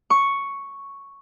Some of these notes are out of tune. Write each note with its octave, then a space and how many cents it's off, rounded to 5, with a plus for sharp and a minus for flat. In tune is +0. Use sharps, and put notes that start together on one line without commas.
C#6 +0